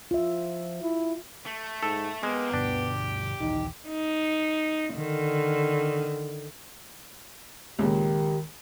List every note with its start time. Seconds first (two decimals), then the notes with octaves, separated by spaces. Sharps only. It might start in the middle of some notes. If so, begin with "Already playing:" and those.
0.11 F3 F4 E5
0.83 E4
1.46 A3
1.83 G#2 A4
2.23 G#3 A#3 B3 G4
2.53 G2 B2 D3 D4 G4
3.40 A#1 D#2 E3 D#4
3.88 D#4
4.95 D3 D#3
7.79 C#2 A#2 D#3 G4